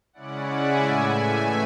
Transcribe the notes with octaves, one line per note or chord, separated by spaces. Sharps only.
C#3 G#3 C#4 E4 D5 F#5
E5 G#5
A2 E3 A3 E5 G#5
E5 G#5